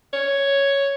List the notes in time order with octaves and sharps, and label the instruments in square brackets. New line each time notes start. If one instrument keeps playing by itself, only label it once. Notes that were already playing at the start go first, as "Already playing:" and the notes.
[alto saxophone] C#5